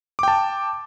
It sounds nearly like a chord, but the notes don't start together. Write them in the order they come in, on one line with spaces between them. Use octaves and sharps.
D6 G5 A5